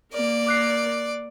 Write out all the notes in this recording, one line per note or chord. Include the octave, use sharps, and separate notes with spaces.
A#3 A#4 D5
D6 F#6 C7